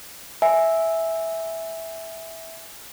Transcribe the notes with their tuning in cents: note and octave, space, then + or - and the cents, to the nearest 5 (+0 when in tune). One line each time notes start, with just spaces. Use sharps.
E5 -5 G#5 +0